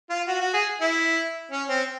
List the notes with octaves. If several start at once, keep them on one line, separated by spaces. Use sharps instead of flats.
F4
F#4
F#4
G#4
E4
C#4
C4